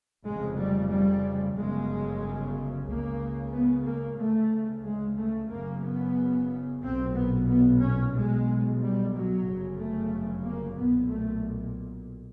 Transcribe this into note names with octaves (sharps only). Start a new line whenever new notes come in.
F1 F2 C#3 G#3
G3
G3
G1 F#2 C#3 G#3
C#2 C#3 A#3
B3
A#3
D2 C#3 A3
G#3
A3
F#1 F#2 C#3 A#3
B3
B1 A#2 C4
B3
B3
C#4
B1 B2 G#3
G3
F#3
G1 F#2 C#3
A3
A#3
B1 A#2 B3
A3